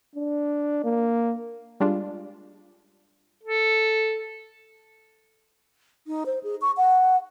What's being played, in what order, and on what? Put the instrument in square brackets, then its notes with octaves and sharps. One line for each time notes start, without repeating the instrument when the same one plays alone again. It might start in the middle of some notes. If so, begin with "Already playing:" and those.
[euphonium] D4
A#3
[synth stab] G3 G#3 D4 F4
[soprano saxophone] A4
[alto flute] D#4
C5
G#4
C#6
F#5